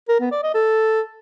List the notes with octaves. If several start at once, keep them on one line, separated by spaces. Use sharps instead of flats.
A#4
B3
D5
D#5
A4